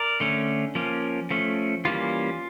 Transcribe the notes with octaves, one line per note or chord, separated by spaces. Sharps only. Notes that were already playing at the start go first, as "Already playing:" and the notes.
Already playing: A#4 D5
D3 A3 C#4
F3 A#3 C#4
F3 A3 C#4
E3 G3 A#3 C#4 F4